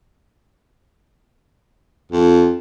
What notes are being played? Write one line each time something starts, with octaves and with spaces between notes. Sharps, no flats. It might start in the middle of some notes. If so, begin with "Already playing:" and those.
F2